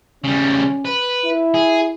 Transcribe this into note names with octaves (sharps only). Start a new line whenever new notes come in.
C#3 G3 C#4
B4
E4
G#4